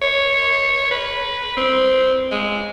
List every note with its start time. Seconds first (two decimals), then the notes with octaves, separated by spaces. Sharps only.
0.02 C#5
0.91 B4
1.57 C4
2.31 G#3